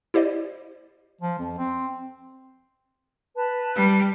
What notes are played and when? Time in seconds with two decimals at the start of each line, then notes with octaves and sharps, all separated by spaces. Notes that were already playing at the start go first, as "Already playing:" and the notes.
0.14 E4 G4 C5 D5 D#5
1.21 F3
1.39 F2
1.58 C4
3.36 B4 A5
3.75 G3